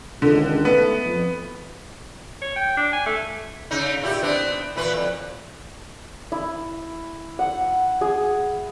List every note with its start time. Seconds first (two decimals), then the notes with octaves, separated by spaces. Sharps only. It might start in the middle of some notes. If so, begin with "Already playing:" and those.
0.22 C#2 D3 D#3
0.65 A3 B3
1.05 F2
2.42 C#5
2.56 G5
2.77 D4
2.93 G#5
3.06 A3
3.71 C#3 D#4
4.02 A#2 E4 G4
4.23 B3 C4 D4
4.76 A#2 E3 B4
4.94 F2
6.32 E4
7.39 F#5
8.01 G#4